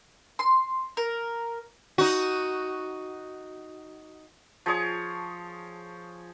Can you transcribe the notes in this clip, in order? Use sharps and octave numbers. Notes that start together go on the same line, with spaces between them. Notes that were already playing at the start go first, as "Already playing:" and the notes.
C6
A#4
D#4 F#4
F3 G#4 C#5 D#6